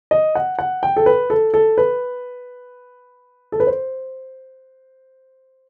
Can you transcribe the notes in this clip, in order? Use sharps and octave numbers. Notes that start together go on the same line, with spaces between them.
D#5
F#5
F#5
G5
A4
B4
A4
A4
B4
A4
B4
C5